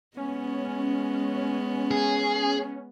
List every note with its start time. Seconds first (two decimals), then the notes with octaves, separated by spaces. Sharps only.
0.17 G#3 B3 C#4
1.91 G#4